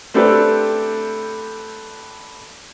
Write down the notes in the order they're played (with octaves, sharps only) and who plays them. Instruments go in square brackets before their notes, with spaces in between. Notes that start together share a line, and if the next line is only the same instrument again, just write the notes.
[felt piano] A3 C4 D4 G4 A4 B4